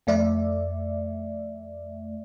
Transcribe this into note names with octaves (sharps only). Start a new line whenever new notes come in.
F2 A3 D5 E5